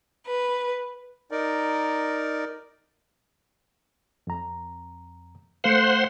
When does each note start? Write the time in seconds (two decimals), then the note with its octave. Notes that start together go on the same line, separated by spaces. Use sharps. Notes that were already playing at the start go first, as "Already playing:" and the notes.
0.26 B4
1.31 D#4 A#4 D5
4.27 F2 A#5
5.64 A3 C5 F5 F#5 C6